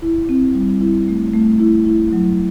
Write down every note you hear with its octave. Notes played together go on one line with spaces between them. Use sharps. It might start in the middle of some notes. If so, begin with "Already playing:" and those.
E4
C4
G3
E4
A3
A3
E4
E4
F#3